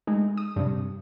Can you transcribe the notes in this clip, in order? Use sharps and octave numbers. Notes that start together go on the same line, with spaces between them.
G#3 A3 D#4
D#6
G2 C3